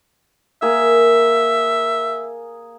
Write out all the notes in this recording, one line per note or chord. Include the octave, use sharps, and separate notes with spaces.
A#3 G#4 E5